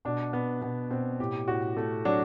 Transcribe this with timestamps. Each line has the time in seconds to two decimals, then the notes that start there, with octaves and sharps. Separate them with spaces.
0.05 B2 D4
0.33 B2 B3
0.62 B2 B3
0.91 B2 C4
1.20 A2 G4
1.48 A2 F#4
1.77 A3
2.05 F#3 D4